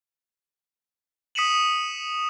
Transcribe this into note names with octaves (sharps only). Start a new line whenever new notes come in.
D#6 B6 C#7 D#7 E7 F#7